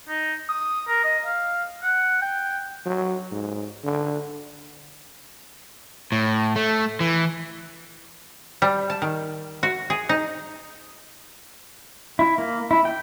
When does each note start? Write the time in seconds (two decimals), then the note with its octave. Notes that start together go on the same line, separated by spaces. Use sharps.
0.09 D#4
0.49 D#6
0.88 A#4
1.04 D#5
1.25 F5
1.83 F#5
2.22 G5
2.86 F#3
3.32 G#2
3.84 D3
6.12 A2
6.56 A3
7.00 E3
8.62 G3
8.90 A5
9.02 D#3
9.63 F#4
9.90 G#4
10.09 D#4
12.19 E4
12.38 A#3
12.71 E4
12.85 G5